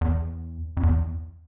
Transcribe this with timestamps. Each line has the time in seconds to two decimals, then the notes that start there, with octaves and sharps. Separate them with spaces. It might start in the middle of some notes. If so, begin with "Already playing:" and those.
0.01 E2
0.77 F2
0.83 E2